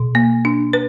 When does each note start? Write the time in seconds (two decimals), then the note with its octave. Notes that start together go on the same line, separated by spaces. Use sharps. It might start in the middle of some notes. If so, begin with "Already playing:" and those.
Already playing: B2
0.15 A#3
0.45 D4
0.73 B4